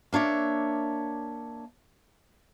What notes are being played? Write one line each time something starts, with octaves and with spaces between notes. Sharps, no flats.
A#3 D4 C#5 E5